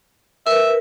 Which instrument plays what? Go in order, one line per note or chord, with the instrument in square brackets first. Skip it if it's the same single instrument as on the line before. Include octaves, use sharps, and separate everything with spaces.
[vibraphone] A#4 B4 [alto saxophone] E5